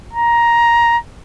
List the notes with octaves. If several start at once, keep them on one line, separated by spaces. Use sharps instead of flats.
A#5